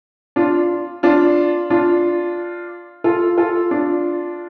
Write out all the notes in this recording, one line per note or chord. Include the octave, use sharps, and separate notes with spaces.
D4 F4
D4 F4
D4 F4
F4 A4
F4 A4
D4 F4